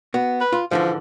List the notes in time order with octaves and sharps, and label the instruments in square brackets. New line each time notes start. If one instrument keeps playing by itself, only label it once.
[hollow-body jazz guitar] B3 F#4
[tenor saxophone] B4
[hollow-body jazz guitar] F4
[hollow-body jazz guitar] G#2 D3 E3 [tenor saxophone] F3